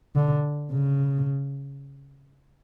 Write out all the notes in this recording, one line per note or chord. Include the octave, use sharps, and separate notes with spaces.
D3
C#3